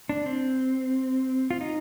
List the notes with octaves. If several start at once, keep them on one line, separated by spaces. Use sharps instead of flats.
D4
C4
F4
D#4